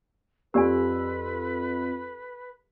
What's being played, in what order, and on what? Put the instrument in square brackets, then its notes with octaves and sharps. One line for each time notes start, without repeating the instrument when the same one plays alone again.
[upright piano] F2 F4 E6 [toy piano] G4 D5 G#5 [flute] B4